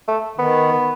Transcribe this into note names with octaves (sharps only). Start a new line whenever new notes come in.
A3
D#3 B3